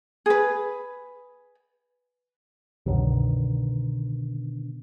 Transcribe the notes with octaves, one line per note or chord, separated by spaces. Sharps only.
G#4 B4
C2 F#2 B2 D3 D#3